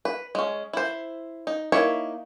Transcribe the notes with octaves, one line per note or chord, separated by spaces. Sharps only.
B4
G#3 C#4
E4 C5
D#4
A#3 D#4 E4 C#5